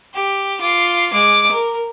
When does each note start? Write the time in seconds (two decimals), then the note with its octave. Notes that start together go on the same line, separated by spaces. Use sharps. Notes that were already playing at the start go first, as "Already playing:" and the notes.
0.14 G4
0.61 F4 D6
1.11 G#3 D6
1.52 A#4